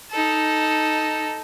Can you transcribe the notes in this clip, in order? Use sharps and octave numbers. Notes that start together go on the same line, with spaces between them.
D#4 A4